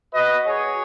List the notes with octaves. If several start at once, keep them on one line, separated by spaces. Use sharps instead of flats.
B3 F#4 B4 D#5
G#4 C#5